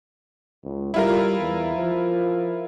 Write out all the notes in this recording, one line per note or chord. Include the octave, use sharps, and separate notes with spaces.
C#2
G3 E4 F4 A#4
E2
F3